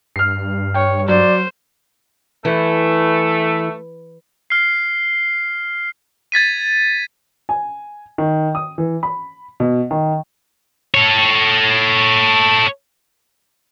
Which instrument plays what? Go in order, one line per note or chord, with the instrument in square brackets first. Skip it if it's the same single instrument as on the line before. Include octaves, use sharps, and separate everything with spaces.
[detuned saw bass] G2 [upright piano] F6 C7
[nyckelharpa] C#5 [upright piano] G5
[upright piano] F#3 [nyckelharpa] C5 [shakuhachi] D5
[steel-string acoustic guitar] E3 [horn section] A3
[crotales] F6 C7
G#6 A6 B6 D#7
[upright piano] G#5
D#3
D#6
E3
B5
B2
D#3
[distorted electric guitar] A4 C#5